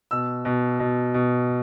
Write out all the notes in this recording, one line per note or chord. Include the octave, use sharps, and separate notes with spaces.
B2 E6
B2
B2
B2